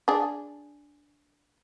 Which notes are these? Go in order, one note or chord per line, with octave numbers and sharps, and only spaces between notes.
D4 G#4